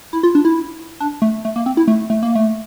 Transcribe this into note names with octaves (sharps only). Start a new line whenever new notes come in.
E4
F4
D4
E4
D4
A3
A3
A#3
C4
E4
A3
A3
A#3
A3